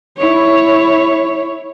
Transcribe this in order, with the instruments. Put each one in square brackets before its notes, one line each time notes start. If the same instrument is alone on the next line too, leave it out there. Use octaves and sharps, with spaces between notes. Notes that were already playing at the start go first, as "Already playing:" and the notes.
[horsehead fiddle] E4 C#5